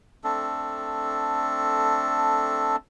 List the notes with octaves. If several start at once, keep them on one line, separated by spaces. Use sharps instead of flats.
A3 C4 D4 A4